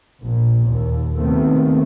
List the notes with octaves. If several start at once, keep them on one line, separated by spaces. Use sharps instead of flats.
A#1 A#2
D#2
D#2 C3 D#3 A3 B3 C4